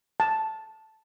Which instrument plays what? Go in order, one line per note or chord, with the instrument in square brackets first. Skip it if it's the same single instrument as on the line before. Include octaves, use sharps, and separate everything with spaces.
[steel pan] A5